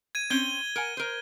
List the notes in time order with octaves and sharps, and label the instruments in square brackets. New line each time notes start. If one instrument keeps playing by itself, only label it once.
[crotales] G#6 D#7
[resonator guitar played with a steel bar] C4 C#4 [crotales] G#6 G7
[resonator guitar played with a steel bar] A#4 F#5 G#5
A#4 C5